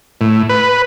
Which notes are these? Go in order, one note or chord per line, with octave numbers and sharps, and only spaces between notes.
A2
B4